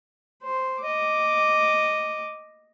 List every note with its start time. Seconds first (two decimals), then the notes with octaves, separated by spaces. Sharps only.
0.43 C5
0.83 D#5 D6